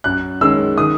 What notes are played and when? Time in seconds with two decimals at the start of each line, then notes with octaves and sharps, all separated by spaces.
0.04 F#2 F#6
0.41 D#3 G#3 C#4 E6
0.78 D#3 D#6